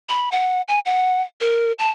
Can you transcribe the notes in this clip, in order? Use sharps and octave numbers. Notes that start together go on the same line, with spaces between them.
B5
F#5
G#5
F#5
A#4
A5